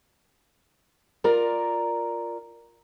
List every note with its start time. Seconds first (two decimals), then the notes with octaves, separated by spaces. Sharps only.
1.24 F4 A#4 D5 A#5